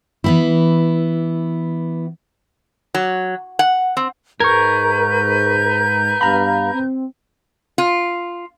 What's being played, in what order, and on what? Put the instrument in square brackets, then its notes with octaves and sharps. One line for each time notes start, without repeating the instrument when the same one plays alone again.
[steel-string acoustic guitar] E3 B3 E4
[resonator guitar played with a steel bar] F#3
F#5
C4
[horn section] G#2 [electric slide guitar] A#4 [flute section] B4 G6 [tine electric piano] C#6 G#6
[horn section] G2 B3 F5 [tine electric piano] A#5 B5
[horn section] C4
[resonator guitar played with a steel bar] F4